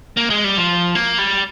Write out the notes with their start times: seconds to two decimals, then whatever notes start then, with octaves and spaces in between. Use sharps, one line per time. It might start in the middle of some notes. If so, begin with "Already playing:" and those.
0.17 A#3
0.30 G#3
0.44 G3
0.57 F3
0.95 A#3
1.18 G3